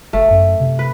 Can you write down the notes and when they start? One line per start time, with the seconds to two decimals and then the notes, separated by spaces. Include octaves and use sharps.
0.13 F#1 A3
0.30 F#2
0.60 C3
0.79 B4